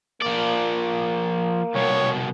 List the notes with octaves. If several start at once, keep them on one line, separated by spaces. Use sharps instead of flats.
F3 A#3 D5
C2 B2 C#5